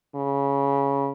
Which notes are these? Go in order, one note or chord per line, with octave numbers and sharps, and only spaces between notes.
C#3